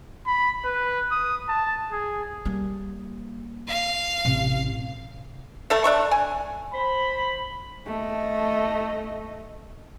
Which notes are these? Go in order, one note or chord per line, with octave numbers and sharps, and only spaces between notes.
B5
B4
D#6
A5
G#4
G3 A#3
F5
A1 C3
A3 A4 E5
A3 D4 E5 C#6
G#5
C5 B5
A3 D#5